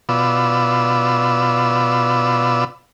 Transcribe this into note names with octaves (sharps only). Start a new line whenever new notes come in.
B2 F4 B4 D5 E6